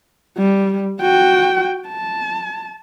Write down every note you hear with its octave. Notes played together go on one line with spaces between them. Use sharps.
G3
F#4 G5
A5